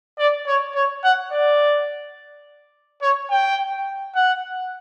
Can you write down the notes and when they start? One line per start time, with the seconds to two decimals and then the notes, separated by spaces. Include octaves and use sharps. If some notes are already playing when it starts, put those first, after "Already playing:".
0.19 D5
0.47 C#5
0.75 C#5
1.04 F#5
1.32 D5
3.02 C#5
3.30 G5
4.15 F#5